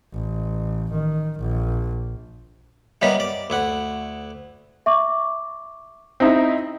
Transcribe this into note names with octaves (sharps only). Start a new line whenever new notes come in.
A1
D#3
A#1
G3 B3 A#4 C#5 D#5 E5
D5
D2 E4 F#5
E5 C#6 D6
C4 D#4 E4